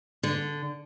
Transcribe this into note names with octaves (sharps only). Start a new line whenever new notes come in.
D3